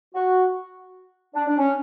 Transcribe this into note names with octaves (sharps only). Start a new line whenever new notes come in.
F#4
D4
D4
C#4